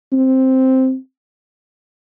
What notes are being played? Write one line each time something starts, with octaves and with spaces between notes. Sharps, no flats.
C4